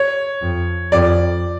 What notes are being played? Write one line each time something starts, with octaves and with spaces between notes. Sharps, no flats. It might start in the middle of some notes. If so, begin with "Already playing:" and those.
Already playing: C#5
F2
F2 D5